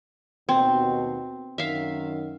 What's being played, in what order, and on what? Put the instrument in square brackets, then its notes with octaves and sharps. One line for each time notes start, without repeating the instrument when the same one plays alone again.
[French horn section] D#2 B2 [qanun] C4
[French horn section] F#2 D#3 [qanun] E5 F5